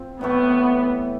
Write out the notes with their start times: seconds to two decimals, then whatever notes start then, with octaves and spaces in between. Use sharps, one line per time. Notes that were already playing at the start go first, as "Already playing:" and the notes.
Already playing: C4 F4
0.21 A2 E3 A3 B3